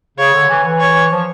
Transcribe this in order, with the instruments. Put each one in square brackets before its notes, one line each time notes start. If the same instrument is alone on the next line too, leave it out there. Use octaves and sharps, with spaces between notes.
[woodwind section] C#3 [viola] C#5
[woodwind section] D3
E3
E3
[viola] C#5
[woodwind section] F3